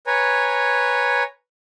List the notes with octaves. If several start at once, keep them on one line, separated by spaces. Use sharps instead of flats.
B4 C#5 G#5 A#5